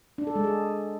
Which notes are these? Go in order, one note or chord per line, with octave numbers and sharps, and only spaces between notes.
D4
A4
G#3
G#4